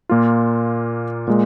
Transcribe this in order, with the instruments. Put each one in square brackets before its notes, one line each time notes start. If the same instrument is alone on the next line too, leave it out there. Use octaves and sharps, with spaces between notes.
[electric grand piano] A#2 A#3 F4
A#2 G#3